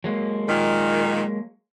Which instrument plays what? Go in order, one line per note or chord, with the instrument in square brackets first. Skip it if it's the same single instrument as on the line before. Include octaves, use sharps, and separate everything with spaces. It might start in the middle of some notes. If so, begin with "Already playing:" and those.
[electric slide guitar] F#3 G#3 A#3
[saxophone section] A#2 D#3